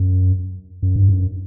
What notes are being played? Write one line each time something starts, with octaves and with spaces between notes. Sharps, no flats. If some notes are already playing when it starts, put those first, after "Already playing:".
Already playing: F#2
F#2
G2
F#2